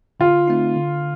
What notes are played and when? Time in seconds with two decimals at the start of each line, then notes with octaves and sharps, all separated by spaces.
0.20 D3 F4
0.47 A3 C4 D#4
0.76 D3